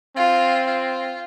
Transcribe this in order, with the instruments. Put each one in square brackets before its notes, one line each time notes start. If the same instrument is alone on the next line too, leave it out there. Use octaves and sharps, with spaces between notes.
[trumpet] C4 [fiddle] F4
[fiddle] F4